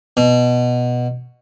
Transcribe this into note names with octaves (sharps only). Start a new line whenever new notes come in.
B2